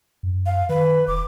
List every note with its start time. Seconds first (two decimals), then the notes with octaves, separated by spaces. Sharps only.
0.23 F#2
0.46 F5
0.69 D#3 B4
1.08 E1 D6